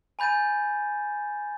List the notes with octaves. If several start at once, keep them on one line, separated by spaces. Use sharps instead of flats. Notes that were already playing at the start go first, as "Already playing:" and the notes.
G#5 B5 G6 A6 D#7